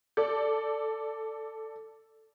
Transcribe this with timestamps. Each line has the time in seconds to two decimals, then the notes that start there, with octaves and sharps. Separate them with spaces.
0.17 A4 D5